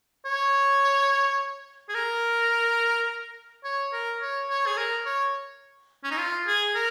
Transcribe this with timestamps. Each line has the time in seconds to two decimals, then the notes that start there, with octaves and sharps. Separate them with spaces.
0.25 C#5
1.89 G#4
1.95 A#4
3.64 C#5
3.93 A#4
4.21 C#5
4.49 C#5
4.67 G#4
4.77 A#4
5.05 C#5
6.04 C#4
6.11 D#4
6.18 F4
6.47 G#4
6.75 A#4